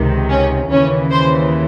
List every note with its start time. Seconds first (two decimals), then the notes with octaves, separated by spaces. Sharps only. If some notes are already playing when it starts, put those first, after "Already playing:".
Already playing: C#2 C3 D#3
0.29 C#4
0.69 D#2 C#3 E3 C#4
1.11 C5